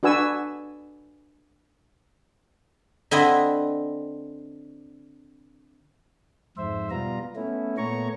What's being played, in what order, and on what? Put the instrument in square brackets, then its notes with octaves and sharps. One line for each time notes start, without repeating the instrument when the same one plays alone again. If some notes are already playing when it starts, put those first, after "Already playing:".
[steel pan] D4 F#4 B4 G#5 E6
[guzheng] D3 C4 E4 B4 D#5
[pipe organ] F2 G#2 C5 E5
B2 G3 B3 F4 A#5
A3 B3 C#4 E4
A#2 A3 B3 C#5 A#5 C#6